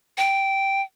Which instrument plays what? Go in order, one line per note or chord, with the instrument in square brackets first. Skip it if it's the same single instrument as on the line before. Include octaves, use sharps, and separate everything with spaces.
[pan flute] G5